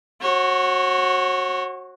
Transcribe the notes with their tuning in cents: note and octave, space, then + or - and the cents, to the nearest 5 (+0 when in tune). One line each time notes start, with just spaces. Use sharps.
F#4 +0 C#5 -40